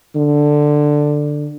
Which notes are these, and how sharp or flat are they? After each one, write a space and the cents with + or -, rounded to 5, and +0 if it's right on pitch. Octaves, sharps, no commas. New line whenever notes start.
D3 +10